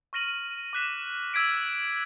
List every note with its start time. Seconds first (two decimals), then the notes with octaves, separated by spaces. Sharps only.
0.13 C#6 F6 A#6 D#7 F#7
0.73 D6 F#6 B6 E7
1.34 E6 G#6 B6 D7